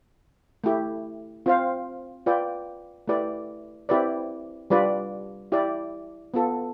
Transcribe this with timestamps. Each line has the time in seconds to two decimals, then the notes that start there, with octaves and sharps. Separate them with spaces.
0.64 A3 E4 G4
1.46 C4 F4 C5 F5
2.26 F4 B4 D5 G5
3.07 A3 E4 G4 B4 D5
3.89 C4 E4 G4 B4 D5
4.70 G3 D4 F4 B4 D5
5.52 E4 G4 D5
6.34 B3 F4 A4